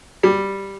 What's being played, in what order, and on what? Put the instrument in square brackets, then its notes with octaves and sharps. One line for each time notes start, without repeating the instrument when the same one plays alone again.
[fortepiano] G3